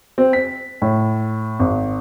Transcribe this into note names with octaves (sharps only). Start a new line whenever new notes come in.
C4
B6
A2
G#1